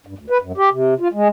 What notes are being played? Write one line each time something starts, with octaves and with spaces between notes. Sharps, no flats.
G2
D2
B4
F#2
G4
C3
F4
G#3